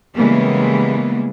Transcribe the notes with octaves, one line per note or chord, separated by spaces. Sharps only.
C#3 E3 G3 G#3 A#3 B3